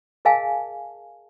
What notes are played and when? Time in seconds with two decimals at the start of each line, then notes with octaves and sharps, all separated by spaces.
0.25 G#4 A#4 D#5 F5 G#5 A5